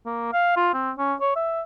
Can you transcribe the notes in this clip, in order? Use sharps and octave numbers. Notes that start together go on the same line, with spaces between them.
A#3
F5
F4
C4
C#4
C#5
E5